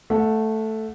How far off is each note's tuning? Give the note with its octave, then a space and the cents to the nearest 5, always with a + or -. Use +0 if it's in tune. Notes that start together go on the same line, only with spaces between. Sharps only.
A3 +0 F#5 -30